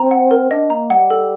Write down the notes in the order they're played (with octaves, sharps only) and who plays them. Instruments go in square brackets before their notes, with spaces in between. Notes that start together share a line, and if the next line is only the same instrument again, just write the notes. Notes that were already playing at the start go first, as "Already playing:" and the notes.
Already playing: [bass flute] C4 [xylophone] A#5
[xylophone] F#5
A#4
[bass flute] D4 [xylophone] D#5
[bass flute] A#3 [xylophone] A#5
[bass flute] G3 [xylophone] F#5
[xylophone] A4